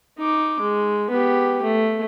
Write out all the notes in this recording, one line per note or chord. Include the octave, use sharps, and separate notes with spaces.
D#4 D6
G#3
B3 G4
A3